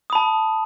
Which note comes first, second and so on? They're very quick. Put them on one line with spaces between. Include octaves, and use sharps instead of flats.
D#6 B5 A5